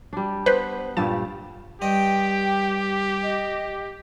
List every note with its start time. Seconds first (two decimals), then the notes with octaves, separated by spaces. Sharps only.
0.13 G3 D4
0.46 B3 B4 C5
0.97 G2 A#2 G3 A5
1.82 G2 G4 D#5 G5
3.23 D#5